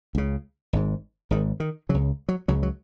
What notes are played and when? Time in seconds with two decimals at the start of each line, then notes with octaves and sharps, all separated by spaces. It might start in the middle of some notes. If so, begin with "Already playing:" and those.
0.15 C#2 C#3
0.73 G#1 G#2
1.31 G#1 G#2 D#3
1.60 D#3
1.89 C#3 F#3
1.94 C#2
2.29 F#3
2.48 C#2 C#3 F#3
2.63 F#3